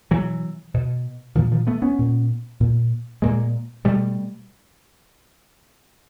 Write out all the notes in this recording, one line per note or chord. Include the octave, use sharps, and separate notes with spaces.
B2 E3 F#3
B2
A#2 D#3 F3
D#3 F3
A3 B3
B3 C#4
A#2
A#2
A#2 G#3 A#3
B2 G3 A3